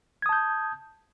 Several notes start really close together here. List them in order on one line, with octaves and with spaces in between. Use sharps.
G#6 D#6 A5 G6